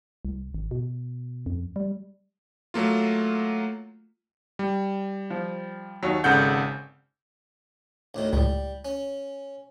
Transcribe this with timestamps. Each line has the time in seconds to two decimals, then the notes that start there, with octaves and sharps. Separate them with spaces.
0.25 C2
0.54 G#1
0.71 B2
1.46 F2
1.76 G3
2.74 F#3 A3 A#3 F4
4.59 G3
5.30 F3
6.03 D#2 F#3
6.24 G#1 C#3 A4 F#5 G6
8.14 D2 A2 D#3
8.33 C#2 A2 G3
8.85 C#4